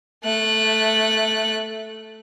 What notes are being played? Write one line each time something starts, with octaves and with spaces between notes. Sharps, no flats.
A3 F#6